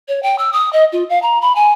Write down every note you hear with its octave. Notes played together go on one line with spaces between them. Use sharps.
C#5
G5
E6
D#6
D#5
F4
F5
A#5
B5
G#5